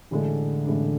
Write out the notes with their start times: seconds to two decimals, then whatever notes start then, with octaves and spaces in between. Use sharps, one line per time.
0.11 A1 A2 D3 G#3 D4
0.66 A1 A2 G#3 D4